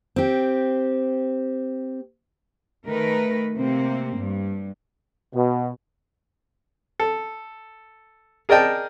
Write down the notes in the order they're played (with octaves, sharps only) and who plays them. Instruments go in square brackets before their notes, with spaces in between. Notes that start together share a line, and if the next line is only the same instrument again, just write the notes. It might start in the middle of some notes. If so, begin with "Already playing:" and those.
[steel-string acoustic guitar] C4 G4
[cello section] D#3 A3 A#4 B4
C3 A#3 C4
G2
[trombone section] B2
[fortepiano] A4
G#4 A#4 D5 D#5 G5 A5